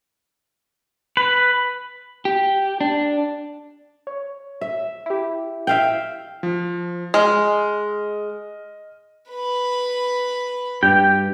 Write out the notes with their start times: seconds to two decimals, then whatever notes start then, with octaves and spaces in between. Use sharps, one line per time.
1.17 B4
2.25 G4
2.81 D4
4.07 C#5
4.61 E5
5.06 E4 G4
5.67 E5 F5 G5
6.43 F3
7.14 G#3 D#5 F6
9.31 B4 B5
10.83 G2 G4 G5